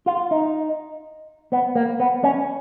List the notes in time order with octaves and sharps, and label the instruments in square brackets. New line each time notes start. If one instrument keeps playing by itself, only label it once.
[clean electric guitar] F4
D#4
B3
A#3
B3
C#4